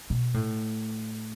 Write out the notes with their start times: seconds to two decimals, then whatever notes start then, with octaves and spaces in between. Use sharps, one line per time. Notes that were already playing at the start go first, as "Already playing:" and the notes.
0.10 B2
0.34 A2